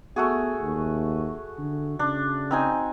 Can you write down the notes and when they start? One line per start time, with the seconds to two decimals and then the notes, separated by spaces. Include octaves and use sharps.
0.16 A3 B3 F#4 G#4
0.62 D#2
1.59 D3
1.99 C#3 D4
2.51 C4 D#4 G#5